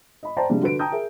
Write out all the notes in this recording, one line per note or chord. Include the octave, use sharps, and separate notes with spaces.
D#5 B5
C5 D5 G5 A5 A#5
C3 F3 G3 G#3 D4
D3 F#4 B4 D7
G5 A5 A#5 D#6 G6
G#4 A#4 E5